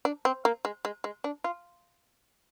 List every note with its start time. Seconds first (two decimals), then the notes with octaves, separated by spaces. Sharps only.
0.05 D4
0.25 C4
0.45 A#3
0.65 G#3
0.85 G#3
1.04 G#3
1.24 D4
1.44 F4